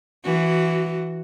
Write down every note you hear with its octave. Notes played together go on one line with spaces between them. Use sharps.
E3 F#4